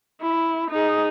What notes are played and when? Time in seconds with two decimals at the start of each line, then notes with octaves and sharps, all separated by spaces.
0.21 E4
0.71 D#4 G#4